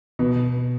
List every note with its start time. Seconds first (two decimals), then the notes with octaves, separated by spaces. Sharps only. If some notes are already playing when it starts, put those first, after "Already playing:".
0.19 B2